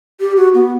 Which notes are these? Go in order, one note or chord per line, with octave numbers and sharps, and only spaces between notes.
G4
F#4
B3